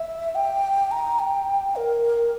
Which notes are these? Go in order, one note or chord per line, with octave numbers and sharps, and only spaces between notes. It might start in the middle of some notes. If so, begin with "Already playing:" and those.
Already playing: E5
G5
A#5
G5
A#4